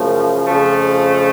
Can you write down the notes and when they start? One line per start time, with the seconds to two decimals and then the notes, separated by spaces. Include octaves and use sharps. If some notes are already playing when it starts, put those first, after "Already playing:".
Already playing: F#2 C#3 F3 A3
0.47 F2 C#3 F3 A3